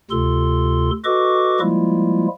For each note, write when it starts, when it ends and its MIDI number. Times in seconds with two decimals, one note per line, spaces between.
0.11 0.91 38
0.11 0.91 48
0.11 0.91 65
0.11 0.91 69
0.11 0.91 84
1.04 1.60 66
1.04 1.60 69
1.04 1.60 71
1.04 1.60 75
1.04 1.60 85
1.04 1.60 86
1.60 2.27 53
1.60 2.27 55
1.60 2.27 56
1.60 2.27 58
1.60 2.27 64
1.60 2.27 65